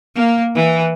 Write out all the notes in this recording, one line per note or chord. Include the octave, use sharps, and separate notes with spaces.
A#3
E3